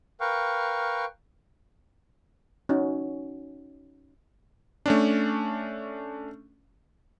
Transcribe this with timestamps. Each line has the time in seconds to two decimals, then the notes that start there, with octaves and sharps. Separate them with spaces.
0.21 A#4 B4 F5 G5 C#6
2.69 C#4 D#4 F#4
4.86 A3 C#4 D4